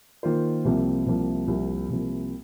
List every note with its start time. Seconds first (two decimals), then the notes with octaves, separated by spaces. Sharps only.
0.23 D#3 A#3 F4 C5
0.65 C2 C3 F3 A#3
1.07 C2 C3 F3 A#3
1.47 C2 C3 F3 A#3
1.90 C2 C3 F3 A#3